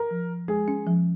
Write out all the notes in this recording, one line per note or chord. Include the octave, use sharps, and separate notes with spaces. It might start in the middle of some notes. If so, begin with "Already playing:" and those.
Already playing: A#4
F3
F3
G#3 G#4
C#4
F3